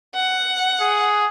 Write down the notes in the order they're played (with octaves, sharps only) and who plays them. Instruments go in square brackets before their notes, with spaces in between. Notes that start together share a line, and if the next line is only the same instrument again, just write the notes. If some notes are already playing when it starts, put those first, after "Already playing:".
[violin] F#5
[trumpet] G#4